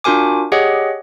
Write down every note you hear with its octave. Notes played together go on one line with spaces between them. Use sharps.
D4 F4 F#4 A#4 G#5 D6
G4 G#4 C#5 D#5 F#5